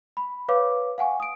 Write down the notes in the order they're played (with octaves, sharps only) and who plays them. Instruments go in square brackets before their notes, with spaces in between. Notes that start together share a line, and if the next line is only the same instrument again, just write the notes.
[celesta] B5
B4 C#5 F5 D6
F5 F#5 G#5 C#6
D#6 D7